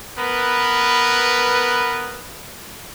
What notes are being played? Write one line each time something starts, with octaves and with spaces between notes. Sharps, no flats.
B3 A#4 B4